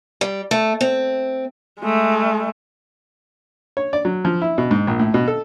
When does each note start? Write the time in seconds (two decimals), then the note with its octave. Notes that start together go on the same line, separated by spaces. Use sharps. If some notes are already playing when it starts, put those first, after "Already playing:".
0.21 G3
0.51 A3
0.81 C4
1.80 G#3 A3
3.77 C#5
3.93 D5
4.05 F#3
4.25 F3
4.42 E4
4.58 B2
4.71 G#2
4.87 A#1
4.99 A2
5.14 B2
5.28 A4